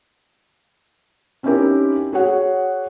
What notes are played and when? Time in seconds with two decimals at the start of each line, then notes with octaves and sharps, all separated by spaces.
1.43 C4 C#4 D#4 E4 G4 A#4
2.12 F#4 G#4 C#5 F#5